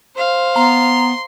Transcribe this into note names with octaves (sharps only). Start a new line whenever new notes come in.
C5 F5
B3 A#5 C6